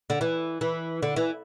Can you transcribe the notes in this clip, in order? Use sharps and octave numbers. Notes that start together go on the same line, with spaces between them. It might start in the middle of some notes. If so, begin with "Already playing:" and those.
D3
E3
E3
D3
E3